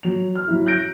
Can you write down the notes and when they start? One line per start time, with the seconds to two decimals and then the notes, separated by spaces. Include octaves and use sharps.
0.03 F#3 F7
0.35 F6
0.48 F#3 E4
0.66 F#6 G6 A#6 D7